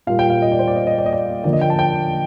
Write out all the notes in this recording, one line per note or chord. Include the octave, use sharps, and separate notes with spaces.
A#2 G3 A#3 F4 F5
G5
F5
D#5
D5
C5
D5
D#5
D#5
D5
D#5
D5
D3 F3 A#3 D5
D#5
G5
A5
G5